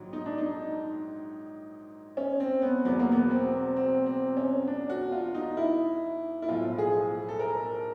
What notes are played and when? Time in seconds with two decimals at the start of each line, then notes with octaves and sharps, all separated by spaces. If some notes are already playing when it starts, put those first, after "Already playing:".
Already playing: A#1 G#2 D#3 F#3
0.13 D#4
0.26 D4
0.38 D#4
2.17 C#4
2.40 C4
2.62 B3
2.85 E1 E2 B2 F#3 B3
2.99 A#3
3.12 B3
3.31 C4
3.76 C4
4.06 C4
4.37 C#4
4.67 D4
4.90 F#4
5.12 F4
5.34 D#4
5.57 E4
6.42 E4
6.49 B1 A2 F3 F4
6.78 G#4
7.29 A4
7.39 A#4